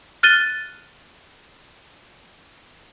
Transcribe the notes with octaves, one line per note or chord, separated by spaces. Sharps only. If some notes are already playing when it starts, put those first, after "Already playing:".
F6 F#6 A6 D#7 G7